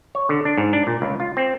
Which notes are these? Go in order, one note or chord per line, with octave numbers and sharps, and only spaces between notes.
C#5
D3
D4
G#2
D4
A#2
C#2
F4
C4